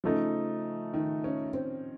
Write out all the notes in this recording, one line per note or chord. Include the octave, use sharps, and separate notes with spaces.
C#3 F3 A3 D#4
D#3
C#4
C4